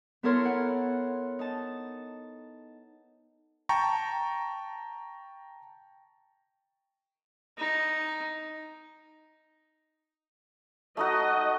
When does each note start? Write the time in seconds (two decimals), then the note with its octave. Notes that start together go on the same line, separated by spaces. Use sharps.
0.23 B3 E4 A4 A#4 C#5 C6
0.45 F#5
1.39 D#4 A5
3.69 G5 A5 A#5 C#6
7.57 D#4
10.97 A3 D#4 F#4 D#5